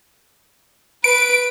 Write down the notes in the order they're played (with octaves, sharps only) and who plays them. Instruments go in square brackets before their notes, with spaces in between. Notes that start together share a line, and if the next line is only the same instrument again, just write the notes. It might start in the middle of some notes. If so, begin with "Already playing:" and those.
[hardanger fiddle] B4 [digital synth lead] D7